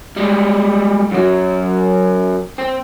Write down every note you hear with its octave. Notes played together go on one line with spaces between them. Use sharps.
G3 G#3
F#2 F#3
C4